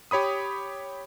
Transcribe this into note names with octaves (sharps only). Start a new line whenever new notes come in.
G4 C#5 B5 D#6